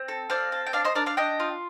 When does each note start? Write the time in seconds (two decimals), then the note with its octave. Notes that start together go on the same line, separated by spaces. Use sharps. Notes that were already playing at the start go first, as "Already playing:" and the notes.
Already playing: C4
0.08 A4
0.30 C4 D5 F5
0.52 A4
0.67 G5
0.73 D4 D5 F5
0.85 C5 D#5
0.95 D4 A#4 D5
1.06 D5 F5
1.17 D4 D#5 G5
1.40 F4